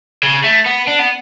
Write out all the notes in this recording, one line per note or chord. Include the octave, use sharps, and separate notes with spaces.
C#3
A3
B3
D4
B3